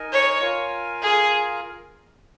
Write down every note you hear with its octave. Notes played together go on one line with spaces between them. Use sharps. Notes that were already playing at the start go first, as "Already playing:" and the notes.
Already playing: D#4 A#4 D#5 G#5
C#5
F4 A#4 F5 G#5
G#4